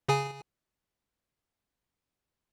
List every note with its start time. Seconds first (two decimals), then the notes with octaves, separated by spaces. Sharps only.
0.08 C#3 G#4 G#5